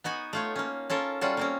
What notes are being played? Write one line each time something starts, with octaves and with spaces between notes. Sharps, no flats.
B3 D#4 F#4 G#5
A3 F4 C#5
A#3 C#4
C#4 F4 A4 A#4
G3 C#4 F4 F#4 A4
A#3 C4 C#4